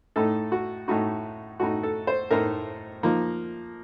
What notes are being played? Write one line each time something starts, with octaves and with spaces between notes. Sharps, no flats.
A2 A3 D#4 A4
F#4
A2 A3 D#4 F#4
A2 A3 D#4 F#4
A4
C5
A2 A3 D#4 A#4
F3 A#3 D#4